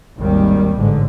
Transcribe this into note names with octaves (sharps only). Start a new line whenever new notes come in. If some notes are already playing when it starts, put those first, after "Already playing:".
G#1 D#2 D#3 G3
A1 G#2 D3